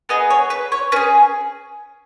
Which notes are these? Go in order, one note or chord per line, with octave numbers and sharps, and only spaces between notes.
B3 G#4 B4 D#5
C#5
B4
C#5
C#4 G#4 B4